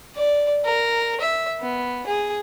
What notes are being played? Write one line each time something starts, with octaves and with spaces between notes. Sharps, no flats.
D5
A#4
E5
B3
G#4